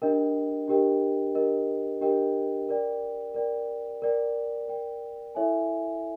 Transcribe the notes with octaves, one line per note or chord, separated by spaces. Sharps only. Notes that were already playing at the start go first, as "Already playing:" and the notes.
D4 G4 A#4 D#5 G5
D4 G4 A#4 D#5 G5
D4 G4 A#4 D#5 G5
D4 G4 A#4 D#5 G5
A#4 D5 G5
A#4 D5 G5
A#4 D5 G5
A#4 D5 G5
E4 A4 C#5 E5 G#5